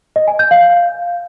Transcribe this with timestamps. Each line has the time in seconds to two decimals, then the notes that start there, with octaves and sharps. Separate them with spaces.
0.16 D#5
0.28 G#5
0.39 G6
0.51 F5